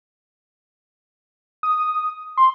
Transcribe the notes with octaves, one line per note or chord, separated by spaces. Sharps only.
D#6
C6